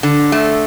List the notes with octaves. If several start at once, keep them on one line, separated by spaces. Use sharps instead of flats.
D3
A3